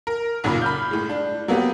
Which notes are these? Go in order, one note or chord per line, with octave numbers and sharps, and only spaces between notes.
A#4
B1 F#2 A#2 C#3 A#3 B5
B5 F6 G6
A2 G#3
D4
F#3 A#3 B3 G4